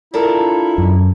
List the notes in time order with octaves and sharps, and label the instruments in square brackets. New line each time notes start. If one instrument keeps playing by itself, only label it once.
[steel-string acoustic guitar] D4 A4 A#4 [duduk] E4 [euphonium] F4
[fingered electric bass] F#2